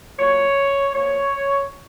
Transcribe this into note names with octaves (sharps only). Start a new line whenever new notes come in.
A#2 F#3 C#5
A#2 F3 C#5